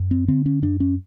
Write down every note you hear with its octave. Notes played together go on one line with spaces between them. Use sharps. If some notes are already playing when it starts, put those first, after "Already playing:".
Already playing: F#2
C4
D3 C4
C#4
F#2 D4
C#4